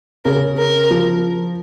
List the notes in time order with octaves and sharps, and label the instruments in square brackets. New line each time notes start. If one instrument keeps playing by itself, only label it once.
[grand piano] C#3 [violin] A#4
[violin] A#4
[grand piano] F3